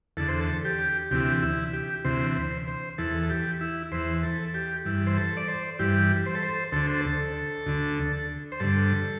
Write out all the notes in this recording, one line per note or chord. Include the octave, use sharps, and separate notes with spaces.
E2 D3 A4
C5
A4
G4
D2 C3 E3 G4
E4
G4
D2 C3 E3 C5
C5
C5
E2 E3 A4
A4
G4
E4
E2 E3 C5
A4
G4
G2 E3
C5
A4
D5
C5
G2 E3 G4
C5
A4
C5
D2 D3 A4
C5
A4
D2 D3
C5
G2 D3 A4